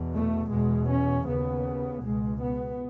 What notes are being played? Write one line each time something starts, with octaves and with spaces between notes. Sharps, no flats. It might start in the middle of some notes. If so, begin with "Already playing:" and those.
Already playing: E2 B2
A3
E2 B2 G#3
C#4
D#2 C#3 B3
C#2 B2 G#3
B3